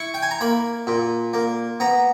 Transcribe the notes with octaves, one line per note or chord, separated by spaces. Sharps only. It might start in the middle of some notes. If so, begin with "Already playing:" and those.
Already playing: E4 C#6
G5
G#5
A#5
A#3 B5
A#2
A#3
B3 A#5